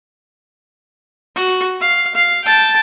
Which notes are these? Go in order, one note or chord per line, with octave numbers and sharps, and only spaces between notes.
F#4
F5
F5
G5 A5